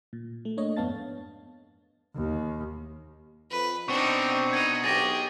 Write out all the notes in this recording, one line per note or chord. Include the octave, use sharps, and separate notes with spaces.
A#2
A3
A3 A#3 D4 C#5 D#5
F2 G#2 B3 F5 A5 A6
D#2
F2 B4
B2 C4 D4 D#4 F#4 C#6
D#4 G#6 D#7
B1 G4 G#4 A6 A#6